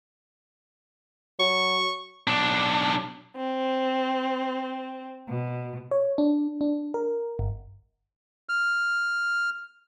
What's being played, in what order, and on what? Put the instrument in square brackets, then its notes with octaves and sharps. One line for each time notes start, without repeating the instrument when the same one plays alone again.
[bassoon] F#3 [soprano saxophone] C#6
[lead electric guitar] B1 D4
[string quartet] C4
B2
[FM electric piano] C#5
D4
D4
A#4
G1
[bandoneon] F6